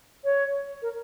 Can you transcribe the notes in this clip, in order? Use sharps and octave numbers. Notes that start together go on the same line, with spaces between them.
C#5
A#4